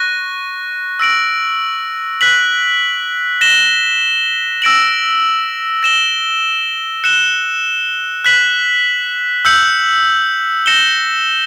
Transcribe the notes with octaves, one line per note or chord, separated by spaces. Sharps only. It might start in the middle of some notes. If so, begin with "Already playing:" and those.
Already playing: C#6 F#6 A#6
E6 A#6 D7 F#7
F#6 B6 F#7
A#6 E7 G7
E6 A#6 D7 F#7
A#6 E7 G7
F#6 C#7 E7 G7
F#6 B6 F#7
E6 G6 C#7 F#7
A#6 C#7 E7 G7